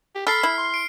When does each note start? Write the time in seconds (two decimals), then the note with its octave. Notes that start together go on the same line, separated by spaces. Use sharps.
0.15 G4
0.27 A4 B5 F6 C7
0.43 E4
0.58 C6
0.74 D7